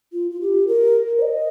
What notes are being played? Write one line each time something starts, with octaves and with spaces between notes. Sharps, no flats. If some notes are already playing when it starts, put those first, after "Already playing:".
F4
F4
G4
A#4
C5
D#5